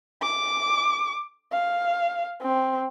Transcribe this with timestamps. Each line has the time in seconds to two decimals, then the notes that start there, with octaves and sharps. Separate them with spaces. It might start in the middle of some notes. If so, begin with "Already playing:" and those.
0.22 D6
1.52 F5
2.42 C4